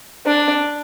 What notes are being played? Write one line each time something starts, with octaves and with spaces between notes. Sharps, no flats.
D4